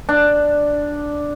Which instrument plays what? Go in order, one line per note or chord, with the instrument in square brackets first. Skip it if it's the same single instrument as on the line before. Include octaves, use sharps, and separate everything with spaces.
[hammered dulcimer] D4